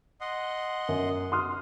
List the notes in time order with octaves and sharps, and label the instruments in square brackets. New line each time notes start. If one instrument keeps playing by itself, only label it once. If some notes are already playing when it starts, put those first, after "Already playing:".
[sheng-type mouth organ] D#5 F#5 C6
[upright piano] F#2
C6 D#6 F6